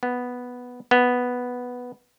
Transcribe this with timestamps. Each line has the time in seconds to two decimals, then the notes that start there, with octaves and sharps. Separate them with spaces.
0.03 B3
0.91 B3